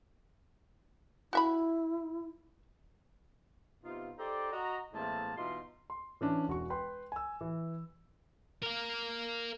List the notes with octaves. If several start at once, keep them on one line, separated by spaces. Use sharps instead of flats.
E4 F#4 E5 B5
C3 B3 D#4 F4
D#4 G4 A4 C5 D5
F#4 D#5 A#5
A2 E3 G#3 A#3 C4 A5
B2 E3 D#4 F4 C6
C6
E3 C#4 D4
E1 F#4 C#6
B4 G5 C6
G#5 E6
E3
A#4 F5